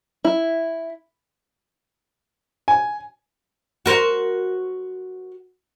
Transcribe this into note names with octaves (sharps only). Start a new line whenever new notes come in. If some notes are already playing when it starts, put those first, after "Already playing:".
E4
G#5
F#4 A#4 C5